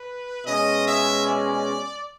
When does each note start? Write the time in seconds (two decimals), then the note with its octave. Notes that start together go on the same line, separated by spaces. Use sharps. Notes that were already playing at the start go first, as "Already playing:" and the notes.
Already playing: B4
0.45 B2 G#3 C#4 D#5
0.85 E5
1.26 D5